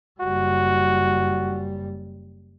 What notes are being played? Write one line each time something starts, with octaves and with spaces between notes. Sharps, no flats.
F#1 G3 F#4